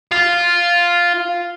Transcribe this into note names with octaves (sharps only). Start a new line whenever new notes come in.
F4